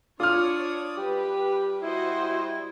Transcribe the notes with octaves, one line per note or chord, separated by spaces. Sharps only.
D4 F4 C#5 D5 D#6 F6
G3 G4 B4
E4 F#4 C5 D#5